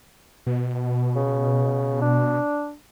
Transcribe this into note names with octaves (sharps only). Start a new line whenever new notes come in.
B2
C#3
D4